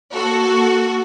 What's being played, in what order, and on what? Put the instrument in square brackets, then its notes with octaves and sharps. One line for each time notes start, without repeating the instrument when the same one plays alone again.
[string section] A#3 F#4 A4